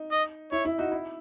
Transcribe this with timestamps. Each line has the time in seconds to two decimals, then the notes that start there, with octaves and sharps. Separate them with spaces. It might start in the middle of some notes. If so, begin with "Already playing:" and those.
Already playing: D#4
0.11 D#5
0.52 E4 C#5
0.65 E4
0.78 D#4 F#4
0.92 E4